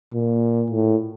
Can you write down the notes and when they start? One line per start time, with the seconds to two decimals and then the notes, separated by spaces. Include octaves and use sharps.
0.14 A#2
0.71 A2